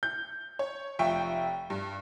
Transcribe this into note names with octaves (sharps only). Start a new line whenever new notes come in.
G6
C#5
F1 F4 E5 G5 C#6
G2